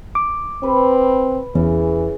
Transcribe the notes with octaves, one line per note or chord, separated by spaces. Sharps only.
D6
C4 B4
E2 C#3 E3